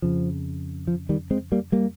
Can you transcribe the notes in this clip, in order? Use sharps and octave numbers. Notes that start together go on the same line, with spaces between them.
F2 C#3 F3
F3
D#3 G3
G#3 C4
G3 A#3
G3 A#3